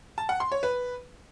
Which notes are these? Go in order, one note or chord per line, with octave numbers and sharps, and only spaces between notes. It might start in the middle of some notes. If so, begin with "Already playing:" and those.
A5
F#5
C6
C#5
B4